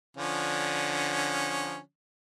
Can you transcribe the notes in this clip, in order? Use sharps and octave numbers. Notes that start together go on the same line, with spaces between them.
D3 F3 C#4